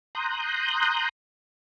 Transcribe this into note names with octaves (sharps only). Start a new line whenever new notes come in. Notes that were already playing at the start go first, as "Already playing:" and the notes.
A#5 C6 D#6 F#6 G6